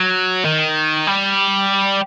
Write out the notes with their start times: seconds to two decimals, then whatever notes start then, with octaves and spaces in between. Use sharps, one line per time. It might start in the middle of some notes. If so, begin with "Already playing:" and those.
Already playing: F#3
0.45 D#3
1.07 G3